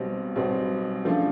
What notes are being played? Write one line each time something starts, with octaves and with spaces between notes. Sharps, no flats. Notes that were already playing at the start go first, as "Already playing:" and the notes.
Already playing: B1 B2 G3 C4
B1 B2 G3 C4
C#3 F3 A3 D4 F4